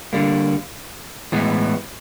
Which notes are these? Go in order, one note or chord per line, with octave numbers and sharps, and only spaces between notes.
D3 G3 A#3
A2 E3 G#3 B3